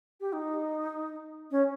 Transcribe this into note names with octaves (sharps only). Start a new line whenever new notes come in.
G4
D#4
C#4